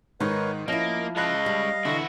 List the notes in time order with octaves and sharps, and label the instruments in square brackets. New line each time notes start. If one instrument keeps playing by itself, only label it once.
[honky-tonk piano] G#2 [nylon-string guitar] D#3 D#4 [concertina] A#4 B4 C#5
[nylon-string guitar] F3 E4 [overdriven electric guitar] A#3 [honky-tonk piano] C#4 [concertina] D#5
[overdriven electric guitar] G#3 C#5 [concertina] D#5 F5 [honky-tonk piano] A5 B5 F#6
[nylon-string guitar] G3
[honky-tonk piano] D3 E3 [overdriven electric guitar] E4 F#4